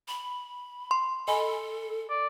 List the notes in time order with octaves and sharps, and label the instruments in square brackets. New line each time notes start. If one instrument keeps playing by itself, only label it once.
[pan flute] B5
[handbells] C6
[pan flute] A4 [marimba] D#5 G#5 B5
[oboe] D5